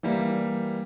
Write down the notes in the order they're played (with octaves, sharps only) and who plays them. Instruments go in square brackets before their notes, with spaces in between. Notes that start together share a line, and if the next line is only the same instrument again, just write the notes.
[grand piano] E3 G3 A#3